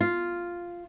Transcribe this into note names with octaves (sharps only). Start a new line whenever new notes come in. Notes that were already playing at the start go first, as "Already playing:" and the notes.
F4